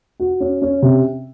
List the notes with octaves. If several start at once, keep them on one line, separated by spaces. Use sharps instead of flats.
F#4
C#4
C#4
C3